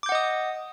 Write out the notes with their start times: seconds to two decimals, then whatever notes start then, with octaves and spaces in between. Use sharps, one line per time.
0.03 D6
0.06 G6
0.09 F#5
0.12 D#5
0.15 D#6